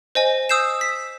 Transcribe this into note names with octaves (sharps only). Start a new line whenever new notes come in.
C5 D#5 G#5
D#6 E6 G6 C7 E7
B6